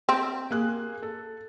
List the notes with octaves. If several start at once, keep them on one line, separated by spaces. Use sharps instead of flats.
C4
A#3 G#4 F#6
A4